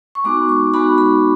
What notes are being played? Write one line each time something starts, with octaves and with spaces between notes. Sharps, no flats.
C#6
G#3 B3 D#4 F#4 D6
C#6
G#3 B3 D#4 F#4 B5
B5